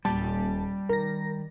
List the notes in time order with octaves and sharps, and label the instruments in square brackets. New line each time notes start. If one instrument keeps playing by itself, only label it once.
[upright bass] D#1 A#2 [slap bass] G3 [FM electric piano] A5
[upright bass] D#3 [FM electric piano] A#4 A#6